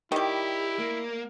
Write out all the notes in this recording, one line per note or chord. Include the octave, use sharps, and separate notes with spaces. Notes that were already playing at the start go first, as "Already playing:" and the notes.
D#3 G3 E4 G4
A#3